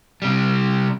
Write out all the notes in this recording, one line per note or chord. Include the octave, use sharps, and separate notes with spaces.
C3 G3